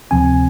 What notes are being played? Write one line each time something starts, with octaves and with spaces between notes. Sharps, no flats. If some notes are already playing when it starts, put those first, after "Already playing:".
D2 C3 F3 C4 G#5